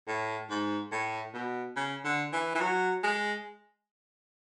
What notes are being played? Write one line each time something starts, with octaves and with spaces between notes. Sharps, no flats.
A2
G#2
A2
B2
C#3
D3
E3
E3
F#3
G#3